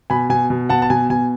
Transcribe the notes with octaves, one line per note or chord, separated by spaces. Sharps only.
B2 G#5 B5
B2 G#5
B2
B2 F#5 A5
A5
B2 G#5
B2 G#5